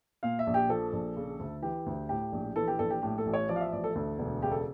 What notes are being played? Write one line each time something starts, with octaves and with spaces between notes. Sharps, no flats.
A#2 F5
E5
A#1
G4
F3 A4
A#1
C#3
D2
E3 G4
D2
A2 G4
A#1
E3 A4
G4
A#1 A4
G4
A2 G4
A4
A1
C#5
F3 D5
F5
E5
A1 D5
A4
D2 A4
E1
C#3 G4
A4